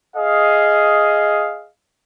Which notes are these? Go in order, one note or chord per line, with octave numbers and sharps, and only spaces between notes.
G#4 D#5 F5